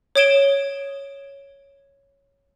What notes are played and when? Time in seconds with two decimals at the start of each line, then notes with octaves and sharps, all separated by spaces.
0.15 C#5 D#6 G#6 D7 E7 G7